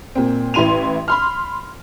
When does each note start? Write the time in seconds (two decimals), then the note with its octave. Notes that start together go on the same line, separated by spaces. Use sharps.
0.15 A#2 C4
0.54 A1 E4 C6 D#7 F7
1.08 B5 C6 F6